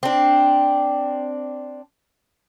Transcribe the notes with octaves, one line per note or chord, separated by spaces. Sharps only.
C4 D4